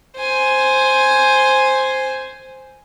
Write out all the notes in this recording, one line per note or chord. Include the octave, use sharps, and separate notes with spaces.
C5 G#5